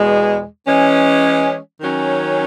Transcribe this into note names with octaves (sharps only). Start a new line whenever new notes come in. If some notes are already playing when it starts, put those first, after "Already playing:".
Already playing: E2 B2 G#3
E3 G#3 C#4
D#3 F#3 C#4